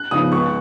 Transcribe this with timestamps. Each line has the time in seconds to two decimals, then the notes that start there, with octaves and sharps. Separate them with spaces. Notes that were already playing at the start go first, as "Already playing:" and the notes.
Already playing: F#6
0.11 C#3 F3 B3 D#4 D#6
0.32 C#2 C#6